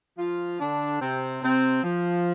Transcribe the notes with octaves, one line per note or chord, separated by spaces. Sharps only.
F3 F4
D3 D4
C3 C4
C3 C4
F3